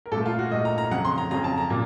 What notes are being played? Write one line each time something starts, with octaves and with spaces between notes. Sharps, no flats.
A#4
A#2 A3 A4
F4
F#4
A#2 A3 D#5
A#5
A#5
F2 C#3 F#3 F#5
C6
A#5
F2 C#3 F#3 A#5
A5
A#5
A#2